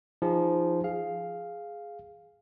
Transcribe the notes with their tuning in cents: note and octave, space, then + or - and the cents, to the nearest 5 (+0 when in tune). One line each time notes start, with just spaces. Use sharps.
F3 -15 D#4 +0 G#4 -30
G#4 +0 F5 +0